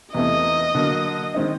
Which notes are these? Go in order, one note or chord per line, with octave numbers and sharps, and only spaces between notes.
E2 C3 E3 A3 D#5
D3 F#3 A#3
D#3 G#3 C4 D#4